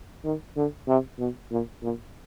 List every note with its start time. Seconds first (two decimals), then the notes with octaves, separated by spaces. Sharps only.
0.24 D#3
0.56 D3
0.88 C3
1.19 B2
1.51 A#2
1.82 A#2